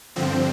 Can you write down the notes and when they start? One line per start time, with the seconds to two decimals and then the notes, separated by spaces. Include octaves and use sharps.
0.16 G2 D3 F3 C4